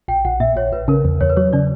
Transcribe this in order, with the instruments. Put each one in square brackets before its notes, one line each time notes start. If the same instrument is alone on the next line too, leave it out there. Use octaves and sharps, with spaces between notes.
[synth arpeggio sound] A#1 [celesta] G5
[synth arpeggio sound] A#1 [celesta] F#5
[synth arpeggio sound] A#2 [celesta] E5
[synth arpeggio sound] A#1 [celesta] C#5
[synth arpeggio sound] A#1 [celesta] B4
[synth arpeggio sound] C#3 [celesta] A#4
[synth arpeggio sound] E2
[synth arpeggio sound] E2 [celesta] C#5
[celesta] B4
[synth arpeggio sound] F#3 [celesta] C#5
[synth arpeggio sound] C#3 [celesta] D5